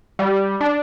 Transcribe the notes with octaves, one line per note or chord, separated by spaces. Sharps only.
G3
D4